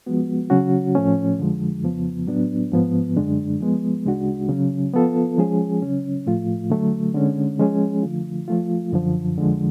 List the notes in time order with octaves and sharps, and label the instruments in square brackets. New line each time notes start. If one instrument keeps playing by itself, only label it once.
[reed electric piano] F3 G#3 B3 F#4
C#3 F#3 C#4 F#4
A2 F3 A3 C#4
F2 D3 F3 G#3
F2 C#3 F3 B3
A2 F#3 B3 D4
G#2 F3 B3
F#2 D3 G#3 D4
F3 G#3 B3
D2 C#3 G#3 D4 F#4
C#3 F#3 C#4
F3 B3 F4 A4
F3 G#3 C#4 G#4
C#3 F#3 C#4
A2 F3 A3 F4
D3 F#3 A3
D3 G#3 C#4
F3 G#3 C#4 G#4
D3 F3 A3 F4
F3 A3 F4
F#2 D3 F3
F2 D3 F3 G#3